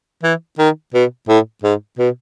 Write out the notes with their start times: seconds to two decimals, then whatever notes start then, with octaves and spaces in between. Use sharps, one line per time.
0.23 E3
0.58 D#3
0.94 B2
1.28 A2
1.63 G#2
1.98 B2